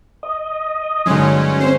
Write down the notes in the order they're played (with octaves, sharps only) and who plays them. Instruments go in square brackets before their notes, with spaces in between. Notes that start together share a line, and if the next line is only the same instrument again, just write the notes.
[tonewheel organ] D#5
[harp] G1 G#3 [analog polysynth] F#3 C#4
[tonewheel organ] C4 [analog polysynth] C#4 C5 [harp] C7